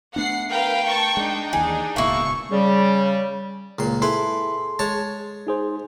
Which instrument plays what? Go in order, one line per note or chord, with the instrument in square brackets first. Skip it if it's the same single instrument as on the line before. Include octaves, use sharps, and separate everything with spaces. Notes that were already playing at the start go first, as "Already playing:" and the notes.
[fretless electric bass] A3 B3 D4 [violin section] F#5 C7
[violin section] A#4 B4 F5 [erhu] G5
[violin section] A5 C#6
[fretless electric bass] G#3 [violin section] D4 D#4
[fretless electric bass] D#2 E3 [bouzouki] G#4
[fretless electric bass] D1 C#2 B2 [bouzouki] A#3 E4 [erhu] C#6
[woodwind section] C#3 G3
[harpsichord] C#2 A#2 C6
[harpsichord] E4 B4 [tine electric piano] G#4 A4 C6
[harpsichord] G#3 C#5 A5
[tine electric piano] D#4 G#4 C5